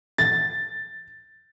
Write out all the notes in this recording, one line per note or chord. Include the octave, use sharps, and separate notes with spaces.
A6